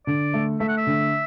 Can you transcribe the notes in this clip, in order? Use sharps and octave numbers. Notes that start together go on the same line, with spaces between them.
D3 D5
A3
A3 E5
F#5
E5
D3